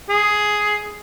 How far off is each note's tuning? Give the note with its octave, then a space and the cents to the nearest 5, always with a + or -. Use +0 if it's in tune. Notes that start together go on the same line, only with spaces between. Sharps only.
G#4 +5